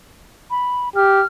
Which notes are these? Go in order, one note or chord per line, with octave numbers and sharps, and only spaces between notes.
B5
G4 F6